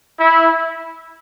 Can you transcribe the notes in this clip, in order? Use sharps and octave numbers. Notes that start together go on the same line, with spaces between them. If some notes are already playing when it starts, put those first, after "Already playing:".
E4